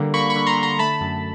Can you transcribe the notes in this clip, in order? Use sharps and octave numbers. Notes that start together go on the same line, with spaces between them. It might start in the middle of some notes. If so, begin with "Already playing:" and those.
Already playing: D3 G3 A#3
A#3 B5 C#6
B5 C#6
D3
A#5 C6
D3
A#5 C6
A3 A5 B5
F#2